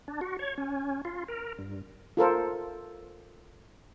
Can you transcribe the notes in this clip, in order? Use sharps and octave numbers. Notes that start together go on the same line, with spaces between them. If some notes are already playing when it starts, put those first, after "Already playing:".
D4
F#4
C#5
C#4
F4
A#4
G2
F4 A4 A#4 C5